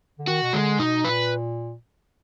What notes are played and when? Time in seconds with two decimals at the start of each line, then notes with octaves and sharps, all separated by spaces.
0.19 D3
0.27 D#3 F#4
0.43 B2
0.53 D3 G#3
0.79 B2 D#4
1.05 A#2 B4